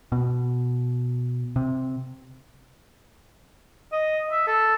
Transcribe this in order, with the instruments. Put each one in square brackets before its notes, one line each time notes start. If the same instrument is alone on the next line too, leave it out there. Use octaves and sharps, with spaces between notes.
[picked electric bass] B2
C3
[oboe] D#5
E5
A4